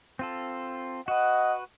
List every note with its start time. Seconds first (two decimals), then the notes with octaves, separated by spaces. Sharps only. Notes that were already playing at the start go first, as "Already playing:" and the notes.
0.19 C4 F4 A4
1.08 F#4 B4 D#5 F#5